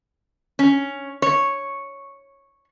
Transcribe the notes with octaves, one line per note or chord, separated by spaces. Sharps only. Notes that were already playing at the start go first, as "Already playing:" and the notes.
C#4
C#5